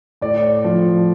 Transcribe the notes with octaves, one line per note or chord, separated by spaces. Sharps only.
A2 D5
F3